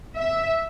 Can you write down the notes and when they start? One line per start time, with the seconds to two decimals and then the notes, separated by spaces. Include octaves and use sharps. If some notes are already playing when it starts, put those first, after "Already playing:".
0.15 E5